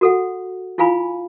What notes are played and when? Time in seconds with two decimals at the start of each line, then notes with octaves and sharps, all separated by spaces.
0.01 F#4 A4 F#5
0.78 E4 F4 F5 G#5 B5